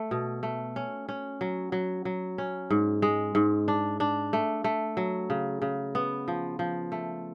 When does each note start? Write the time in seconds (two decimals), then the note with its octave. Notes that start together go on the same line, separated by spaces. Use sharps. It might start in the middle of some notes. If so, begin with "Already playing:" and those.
Already playing: A3
0.11 B2
0.43 A3
0.76 C#4
1.09 C#4
1.41 F#3
1.72 F#3
2.05 F#3
2.38 C#4
2.70 G#2
3.02 G#3
3.35 G#2
3.68 D4
4.00 D4
4.33 A3
4.64 A3
4.97 F#3
5.30 C#3
5.62 C#3
5.95 B3
6.28 F3
6.59 F3
6.92 A3